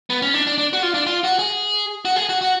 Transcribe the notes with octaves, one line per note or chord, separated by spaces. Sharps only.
B3
C#4
D4
D4
D4
F#4
F4
D4
F4
F#4
G#4
F#4
G#4
F#4
F#4